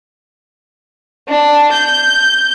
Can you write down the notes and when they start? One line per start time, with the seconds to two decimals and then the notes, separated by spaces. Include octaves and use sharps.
1.29 D4
1.73 G6